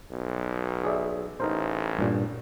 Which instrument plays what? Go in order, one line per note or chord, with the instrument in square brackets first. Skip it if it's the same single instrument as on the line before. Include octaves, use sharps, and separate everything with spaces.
[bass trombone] B1
[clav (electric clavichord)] G#4 D5 E5
[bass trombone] A1 [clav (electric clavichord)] D#4 A#4 C5
[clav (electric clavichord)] G2 A#2